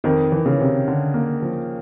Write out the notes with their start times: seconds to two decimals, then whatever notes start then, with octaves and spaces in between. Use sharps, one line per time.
0.04 F2 D#3
0.32 E3
0.46 C#3
0.60 C3
0.88 D3
1.14 A#3
1.42 F3